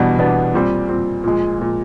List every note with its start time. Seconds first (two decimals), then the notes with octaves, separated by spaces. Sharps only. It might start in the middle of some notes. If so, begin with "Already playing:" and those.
Already playing: E2 B2 G3 B3 D4
0.19 E2 B2 G3 B3 D4
0.53 A#2 G3 C4
0.89 A#2 G3 C4
1.24 A#2 F3 G#3
1.59 A#2 F3 G#3